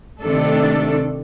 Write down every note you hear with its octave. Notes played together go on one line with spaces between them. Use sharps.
C3 D#3 A3 D4 A4